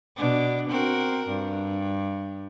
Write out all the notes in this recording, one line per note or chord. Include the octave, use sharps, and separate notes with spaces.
B2 D4
C4 F#4 A#4
G2